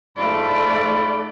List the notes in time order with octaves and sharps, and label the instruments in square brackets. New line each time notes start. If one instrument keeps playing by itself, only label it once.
[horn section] G#2 F4 B5 [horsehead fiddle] A3 D5